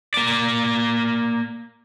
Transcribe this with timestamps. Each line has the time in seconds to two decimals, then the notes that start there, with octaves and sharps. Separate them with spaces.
0.14 A#3 D5